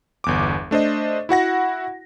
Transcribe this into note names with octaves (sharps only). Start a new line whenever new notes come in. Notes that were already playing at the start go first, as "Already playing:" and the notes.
G1 E2 D6
A3 D4 C5 D#5
E4 F#4 F#5 A#6